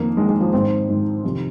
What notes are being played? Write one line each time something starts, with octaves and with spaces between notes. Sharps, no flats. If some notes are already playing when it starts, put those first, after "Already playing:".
Already playing: F2 D#3 A#3
F2 D#3 G#3
G#3
F3
G#2 D#3 C4
G#2 D#3
F2 C3 D#3